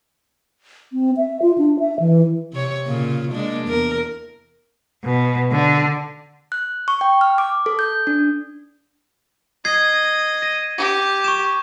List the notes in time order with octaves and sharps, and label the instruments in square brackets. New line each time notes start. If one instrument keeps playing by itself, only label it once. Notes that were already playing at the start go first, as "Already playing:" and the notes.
[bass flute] C4
E5
F4
D4
E5
E3
[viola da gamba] C3 C#5
A#2 C#3 F4
G#3 A#3 D4
E2 A#4
[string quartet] B2
D3
[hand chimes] F#6
C#6
G5
F6
D6
A4
G6
D4
[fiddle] D#5 [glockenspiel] G#6 C7
[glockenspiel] A#6 D#7
[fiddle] G4
[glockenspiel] C#6 E7